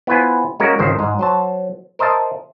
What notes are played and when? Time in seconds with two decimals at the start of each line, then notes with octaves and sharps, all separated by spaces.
0.07 B3 E4 F4 B4 C5 G#5
0.60 G#3 A#3 C#4 F#4 A#4
0.79 G#1 C#2 D#3 C5
0.99 G#2 G#3
1.19 F#3 C5 A5
1.99 A#4 C5 D#5 E5 A5